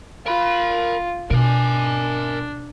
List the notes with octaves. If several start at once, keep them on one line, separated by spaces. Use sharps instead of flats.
F4 A#4 B5
B2 D4 A#4 G#5